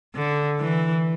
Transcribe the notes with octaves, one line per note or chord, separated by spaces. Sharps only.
D3
E3